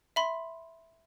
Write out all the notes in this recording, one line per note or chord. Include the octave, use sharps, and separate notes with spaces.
E5 B5 C6